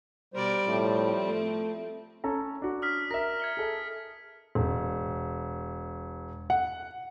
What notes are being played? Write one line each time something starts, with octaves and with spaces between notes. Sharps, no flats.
B2 G3 A#4 C5 D5
A2 F3 C4
A3
C#4 A4 A#5
D4 F#4
D#6 F6 B6
A#4 E5 A#6
G#6 C#7 G7
G#4 A4 E5
E1
F#5